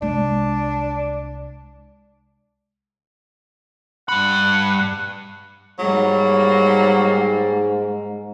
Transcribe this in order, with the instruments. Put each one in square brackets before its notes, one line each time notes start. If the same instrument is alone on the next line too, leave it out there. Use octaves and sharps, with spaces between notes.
[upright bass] C2 G#3 [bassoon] D4
[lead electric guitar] G2 B5 [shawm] F#5
[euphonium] G#2 [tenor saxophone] F#3 [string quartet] G3 A#3